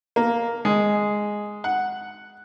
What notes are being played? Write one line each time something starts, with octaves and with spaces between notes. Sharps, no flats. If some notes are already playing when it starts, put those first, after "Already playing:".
A#3
G#3
F#5